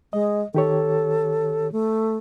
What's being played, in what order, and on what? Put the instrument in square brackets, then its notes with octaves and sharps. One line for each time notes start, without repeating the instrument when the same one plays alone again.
[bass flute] G#3 [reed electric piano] D#5
[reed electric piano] D#3 G4 C#5 [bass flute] A4
[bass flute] A3